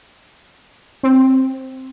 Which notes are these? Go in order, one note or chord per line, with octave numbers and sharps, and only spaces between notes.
C4